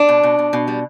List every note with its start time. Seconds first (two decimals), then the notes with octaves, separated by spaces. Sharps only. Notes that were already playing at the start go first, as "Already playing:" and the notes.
Already playing: D4
0.09 B2
0.23 B2
0.39 B2
0.53 B2
0.68 G3